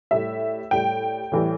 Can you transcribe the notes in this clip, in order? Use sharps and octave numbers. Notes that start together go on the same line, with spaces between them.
A2 G3 E5
A2 G3 G5
A2 E3 G3